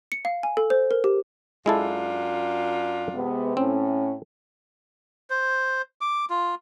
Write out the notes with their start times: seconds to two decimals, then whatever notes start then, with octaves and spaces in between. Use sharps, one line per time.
0.12 C#7
0.25 F5
0.43 G#5
0.57 A4
0.70 C5
0.91 A#4
1.04 G4
1.66 F#2 G#3 D4 E4 F4 A4
3.14 C3 G#3 B3
3.57 A2 C4 C#4
5.30 C5
6.01 D6
6.30 F4